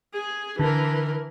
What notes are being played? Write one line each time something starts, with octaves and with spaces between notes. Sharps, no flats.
G#4
D3 E3 A#4